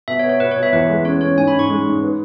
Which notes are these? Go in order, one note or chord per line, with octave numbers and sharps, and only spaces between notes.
B2 E5
C#5
B3
C#5
B2 B4
C#5
B2
E5
E2 B4
G#3
C#4 C#5
C#4 C#5
G#2 G#5
B5
G#2
C#6
G#3
G#2
B4